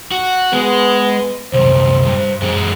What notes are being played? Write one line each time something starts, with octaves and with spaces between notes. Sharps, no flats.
F#4
G#3 B3
C2 F#2 C5
G2
F#2 G#3